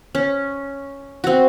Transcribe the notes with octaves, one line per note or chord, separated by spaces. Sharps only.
C#4
C4 F#4